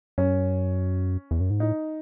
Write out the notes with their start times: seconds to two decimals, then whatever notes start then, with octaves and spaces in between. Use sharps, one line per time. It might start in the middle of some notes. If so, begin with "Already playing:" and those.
0.18 F#2 C#4
1.31 E2
1.40 F#2
1.50 G#2
1.60 A2 D#4